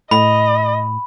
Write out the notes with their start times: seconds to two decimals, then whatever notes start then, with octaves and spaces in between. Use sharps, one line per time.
0.11 A2 D#5 B5